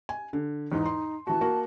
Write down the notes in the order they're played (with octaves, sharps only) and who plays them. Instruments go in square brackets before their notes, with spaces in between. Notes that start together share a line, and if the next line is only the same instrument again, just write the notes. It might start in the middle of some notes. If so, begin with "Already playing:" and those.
[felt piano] G#5
D3
[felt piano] E2 G#2 [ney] D#4
[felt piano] C6
[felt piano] E3 F#4 [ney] A5
[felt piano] A#3 F#4